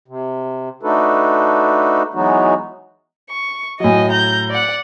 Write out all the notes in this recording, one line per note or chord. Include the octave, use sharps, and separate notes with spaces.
C3
A3 D4 D#4 F#4 A4 B4
E3 F#3 G#3 B3 D#4 F#4
C#6
A2 F#3 D#5 G#5
A#5 G6
D5 F#5